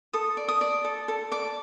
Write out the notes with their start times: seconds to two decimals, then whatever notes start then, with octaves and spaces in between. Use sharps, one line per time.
0.13 A4 D#6
0.37 D5
0.48 D#6
0.61 D5
0.85 A4
1.08 A4
1.32 D5 D6